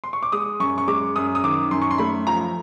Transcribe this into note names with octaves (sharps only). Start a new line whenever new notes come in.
C6
C#6
D6
G#3 D#6
F#2 C#6
C#6
G#3 D6
F#2 D#6
D#6
D#3 D6
F#2 C6
C#6
C6
A3 B5
F3 A#5